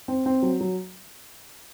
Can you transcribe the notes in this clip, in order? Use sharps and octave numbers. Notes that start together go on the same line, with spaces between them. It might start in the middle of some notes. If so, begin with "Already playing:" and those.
C4
C4
F#3
F#3